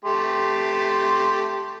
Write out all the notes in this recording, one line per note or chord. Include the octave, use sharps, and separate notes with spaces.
A3 G4 C6